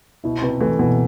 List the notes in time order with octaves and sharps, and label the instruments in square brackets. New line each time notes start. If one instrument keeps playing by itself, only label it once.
[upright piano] B2 [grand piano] E4
[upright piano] C3 [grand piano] B4
[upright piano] E3 [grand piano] A3
[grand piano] B2 [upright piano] E3